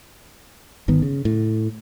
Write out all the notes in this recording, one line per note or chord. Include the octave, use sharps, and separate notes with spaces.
G1 D#3 B3
C#3
A2